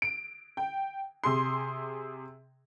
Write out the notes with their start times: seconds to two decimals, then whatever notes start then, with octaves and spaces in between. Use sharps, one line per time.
0.02 D7
0.57 G5
1.24 C3 G#4 C6